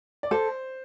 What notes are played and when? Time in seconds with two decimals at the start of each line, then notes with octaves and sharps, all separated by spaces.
0.23 D5
0.31 A4 C5